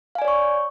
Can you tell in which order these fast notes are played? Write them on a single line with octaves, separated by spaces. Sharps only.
F5 G#5 D5 C#5 C#6